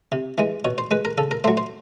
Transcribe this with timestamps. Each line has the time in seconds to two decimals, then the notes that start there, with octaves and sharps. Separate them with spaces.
0.12 C3
0.38 E3 G#3
0.65 B2 C#5
0.78 C5
0.91 G#3 B4
1.05 A#4
1.18 C#3 A4
1.31 A#4
1.44 F#3 A3 C5
1.57 C5